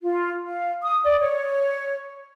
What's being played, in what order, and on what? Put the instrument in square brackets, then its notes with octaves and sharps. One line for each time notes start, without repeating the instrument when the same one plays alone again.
[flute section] F4
F5
D#6
D5
C#5